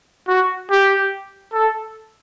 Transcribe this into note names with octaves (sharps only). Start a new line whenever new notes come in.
F#4
G4
A4